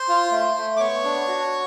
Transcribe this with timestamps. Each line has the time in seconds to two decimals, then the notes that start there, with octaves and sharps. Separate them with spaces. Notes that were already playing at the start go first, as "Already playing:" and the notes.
Already playing: C5 C6
0.08 F4
0.31 A3
0.56 A3
0.76 D6
0.80 B3 C#5 C#6
1.04 D4
1.28 F#4